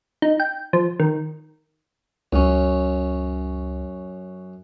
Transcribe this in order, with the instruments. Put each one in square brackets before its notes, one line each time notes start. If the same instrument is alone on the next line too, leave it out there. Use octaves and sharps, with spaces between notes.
[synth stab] D#4
G5
F3
D#3
[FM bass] C#2 [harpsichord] F#2 C#4